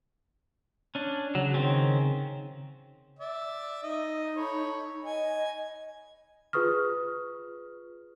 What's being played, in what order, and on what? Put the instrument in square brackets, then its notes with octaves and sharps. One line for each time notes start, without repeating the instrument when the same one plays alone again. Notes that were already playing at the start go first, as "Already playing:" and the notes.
[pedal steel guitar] C#4 D4
[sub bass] C#3 [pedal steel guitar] F#3
[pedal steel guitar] D#3 C4 C#4
[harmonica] D5 E5
[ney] D#4 [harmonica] D#5
[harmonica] A4 C#5 B5
[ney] D#5 [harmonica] G#5
[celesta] F4 G#4 B4 C#6 D#6 F6